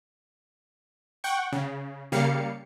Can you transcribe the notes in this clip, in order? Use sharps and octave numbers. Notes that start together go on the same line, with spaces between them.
F#5 G5 C#6
C#3
C#3 G3 A#3 F5 C#7